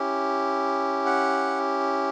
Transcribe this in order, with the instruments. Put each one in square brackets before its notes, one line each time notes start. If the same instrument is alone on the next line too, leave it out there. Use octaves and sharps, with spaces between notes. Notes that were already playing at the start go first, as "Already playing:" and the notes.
Already playing: [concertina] C#4 E4 G4
F#5